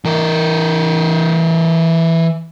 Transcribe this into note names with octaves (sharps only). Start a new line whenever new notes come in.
E3 A#4